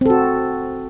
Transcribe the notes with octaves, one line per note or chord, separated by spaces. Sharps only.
C4 F#4 A4